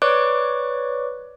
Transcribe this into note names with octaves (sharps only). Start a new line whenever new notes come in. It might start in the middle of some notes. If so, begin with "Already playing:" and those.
B4 C#5 D5 C#6 D6 F#6